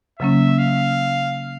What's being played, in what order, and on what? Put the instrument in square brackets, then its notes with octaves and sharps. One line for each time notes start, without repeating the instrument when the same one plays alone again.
[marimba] C#3 F#3 A#3 C#4 [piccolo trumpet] E5
[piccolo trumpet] F5